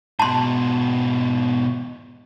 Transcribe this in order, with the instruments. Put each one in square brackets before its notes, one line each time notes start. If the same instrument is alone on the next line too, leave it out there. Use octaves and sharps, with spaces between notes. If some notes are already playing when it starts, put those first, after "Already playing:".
[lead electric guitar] G#2 B2 [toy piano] A5 C6